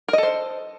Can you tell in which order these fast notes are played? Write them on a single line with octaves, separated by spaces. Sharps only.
A#4 D#5 A4 C5